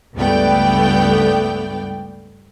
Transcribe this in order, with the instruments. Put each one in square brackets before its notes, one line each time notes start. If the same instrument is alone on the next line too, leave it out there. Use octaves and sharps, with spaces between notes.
[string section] C#2 G2 A3 B3 D5 G5